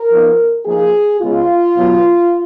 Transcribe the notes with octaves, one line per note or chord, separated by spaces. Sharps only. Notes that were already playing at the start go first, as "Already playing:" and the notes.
Already playing: A#4
F3 B3 D#4
F3 A#3 D#4 G#4
C#3 G#3 B3 F4
B2 F#3 B3